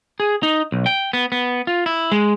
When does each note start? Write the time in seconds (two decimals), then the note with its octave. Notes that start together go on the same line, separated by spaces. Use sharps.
0.20 G#4
0.43 D#4
0.72 B1
0.86 G5
1.13 B3
1.32 B3
1.67 F4
1.86 E4
2.12 G#3